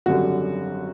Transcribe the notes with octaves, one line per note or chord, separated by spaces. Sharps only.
G#1 F#2 D3 G3 F#4